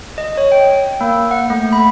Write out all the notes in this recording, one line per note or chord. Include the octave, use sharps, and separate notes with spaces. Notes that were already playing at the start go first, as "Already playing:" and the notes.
D#5
C#5
G5
A#3
F#5
A3
B5